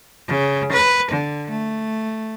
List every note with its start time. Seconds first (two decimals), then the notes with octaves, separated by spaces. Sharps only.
0.28 C#3
0.72 B4
1.11 D3
1.50 A3